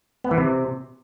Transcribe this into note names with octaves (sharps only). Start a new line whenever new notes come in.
B3
E3
C3